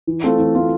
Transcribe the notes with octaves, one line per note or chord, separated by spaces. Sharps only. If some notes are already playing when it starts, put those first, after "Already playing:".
E3
A3 C4 F4
E3
A3 C4 F4